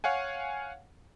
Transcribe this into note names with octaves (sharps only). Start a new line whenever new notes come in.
C#5 F5 F#5 G#5